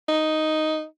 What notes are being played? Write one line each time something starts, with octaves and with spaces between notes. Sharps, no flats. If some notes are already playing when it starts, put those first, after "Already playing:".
D#4